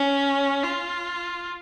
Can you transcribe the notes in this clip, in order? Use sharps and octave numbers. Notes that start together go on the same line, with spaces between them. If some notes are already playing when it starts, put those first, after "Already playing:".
Already playing: C#4
F4